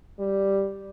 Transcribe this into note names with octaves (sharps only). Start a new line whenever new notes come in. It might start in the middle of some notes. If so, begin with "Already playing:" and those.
G3